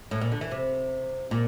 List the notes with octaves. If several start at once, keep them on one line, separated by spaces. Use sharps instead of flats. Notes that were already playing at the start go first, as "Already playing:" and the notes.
A2
A#2
D3
E3
C3
A#2